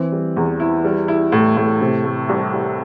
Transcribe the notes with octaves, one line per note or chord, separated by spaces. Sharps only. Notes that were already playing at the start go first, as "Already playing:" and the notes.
Already playing: E3 C4
G3
E2
E4
G3
E4
A2
A2
C3
A3
C2
C2